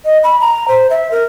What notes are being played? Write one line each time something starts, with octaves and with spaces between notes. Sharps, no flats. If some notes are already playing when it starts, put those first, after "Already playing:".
D#5
B5
A#5
C5
E5
A#4